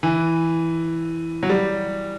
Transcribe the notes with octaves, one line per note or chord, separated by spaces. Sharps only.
E3
F#3
G3